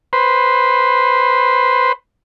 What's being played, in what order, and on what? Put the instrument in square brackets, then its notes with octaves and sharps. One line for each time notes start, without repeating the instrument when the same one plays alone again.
[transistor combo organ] B4 C5